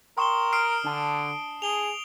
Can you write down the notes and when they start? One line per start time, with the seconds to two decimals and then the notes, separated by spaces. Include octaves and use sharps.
0.18 A#4 G5 C6 C#6 D#6 E7 G7
0.53 D#6 F6 C7 D7
0.85 D3 D4 A5
1.62 G#4 F7 G7